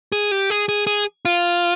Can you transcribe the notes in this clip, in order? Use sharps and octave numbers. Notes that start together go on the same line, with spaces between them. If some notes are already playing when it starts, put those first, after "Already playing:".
G#4
G4
G#4
G#4
G#4
F4